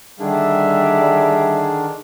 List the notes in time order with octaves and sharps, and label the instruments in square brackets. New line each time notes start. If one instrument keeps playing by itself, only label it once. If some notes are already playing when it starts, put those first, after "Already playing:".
[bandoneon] D3 D#3 D4 [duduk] G3 [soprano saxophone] G#4 [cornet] E5